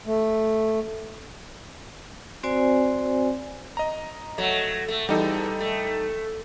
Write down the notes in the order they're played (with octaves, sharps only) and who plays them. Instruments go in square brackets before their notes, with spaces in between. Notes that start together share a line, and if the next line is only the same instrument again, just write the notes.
[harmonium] A3
[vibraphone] C4 F#4 C5 D5 G#5
[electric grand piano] D#5 A#5
[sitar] F#3 A3
A3
[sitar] E2 [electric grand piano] G3 D#4 A4
[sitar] A3